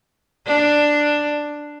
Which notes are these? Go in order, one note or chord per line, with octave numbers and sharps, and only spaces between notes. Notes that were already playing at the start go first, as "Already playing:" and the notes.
D4